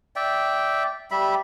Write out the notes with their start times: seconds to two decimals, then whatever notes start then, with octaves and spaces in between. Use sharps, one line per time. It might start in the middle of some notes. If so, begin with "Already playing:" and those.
0.16 D5 E5 G5
1.11 G3 E5 B5